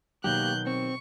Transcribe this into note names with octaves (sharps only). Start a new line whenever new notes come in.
B2 D#3 F#3 A#3 G4 F#6 G6
C4 C#6